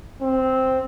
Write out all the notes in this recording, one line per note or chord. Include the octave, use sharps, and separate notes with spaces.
C4